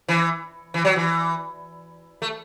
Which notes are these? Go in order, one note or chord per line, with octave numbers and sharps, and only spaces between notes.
E3
E3
F#3
E3
A3